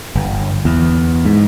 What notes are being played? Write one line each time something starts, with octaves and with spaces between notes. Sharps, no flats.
G1
E2
G#2